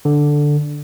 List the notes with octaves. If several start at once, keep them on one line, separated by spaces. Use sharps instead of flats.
D3